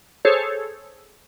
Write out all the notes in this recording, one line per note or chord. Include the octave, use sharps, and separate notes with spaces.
G#4 A4 C5 C#5